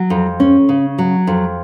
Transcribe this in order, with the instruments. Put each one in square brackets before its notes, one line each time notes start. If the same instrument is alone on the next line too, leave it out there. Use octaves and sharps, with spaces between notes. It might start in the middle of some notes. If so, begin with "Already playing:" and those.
Already playing: [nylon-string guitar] F#3
F2
C#4
C#3
F#3
F2